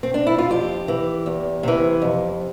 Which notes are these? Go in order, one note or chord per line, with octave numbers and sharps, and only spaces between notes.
C4
D4
E4
F4
F2 G4
E3
E2
C3 E3
F2